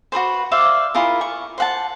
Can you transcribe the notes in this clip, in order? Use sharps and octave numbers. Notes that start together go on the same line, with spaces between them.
F#4 G#4 B4 C5
C5 D5 E5 F5
E4 F4 G#4 A#4
C#6
C5 F#5 A5